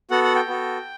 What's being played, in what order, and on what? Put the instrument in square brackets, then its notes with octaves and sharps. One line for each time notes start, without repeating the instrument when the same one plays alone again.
[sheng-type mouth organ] B3 F#4 A4 F#5
F#5
G5
B3 F#4 A4